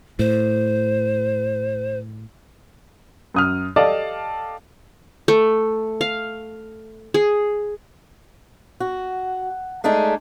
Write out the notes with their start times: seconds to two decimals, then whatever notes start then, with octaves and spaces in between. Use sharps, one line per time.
0.19 A2 C5
3.34 F#2 D#6 F6
3.76 G4 A4 D5 D#5 F5 A5
5.28 A3
6.01 F5
7.14 G#4
8.80 F#4
9.84 G#3 A3 D4 D#4 G#4